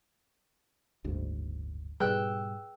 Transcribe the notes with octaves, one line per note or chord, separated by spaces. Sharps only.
F#1 D2 G#2
G#2 B2 G3 G#4 B4 G5 E6 F#6